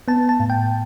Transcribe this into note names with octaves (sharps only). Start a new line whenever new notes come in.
B3 A5
A5
A2
G5